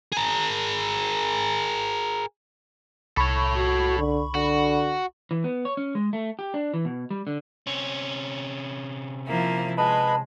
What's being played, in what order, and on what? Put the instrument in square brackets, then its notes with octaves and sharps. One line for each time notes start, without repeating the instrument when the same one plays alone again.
[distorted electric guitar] G#4 A#4
[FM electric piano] C2 B5 C#6 [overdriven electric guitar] A4 C#5
[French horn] F#4
D3
[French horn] D3 [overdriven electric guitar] F#4
[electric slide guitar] E3
B3
C#5
C#4
G#3
A3
G4
D4
E3
B2
G3
D3
[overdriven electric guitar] C3 C#4
[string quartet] F3 A#3 E4
[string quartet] G#3 [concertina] B4 D#5 B5 [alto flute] A5